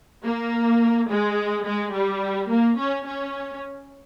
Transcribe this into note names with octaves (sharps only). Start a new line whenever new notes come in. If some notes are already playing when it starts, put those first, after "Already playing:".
A#3
G#3
G#3
G3
A#3
C#4
C#4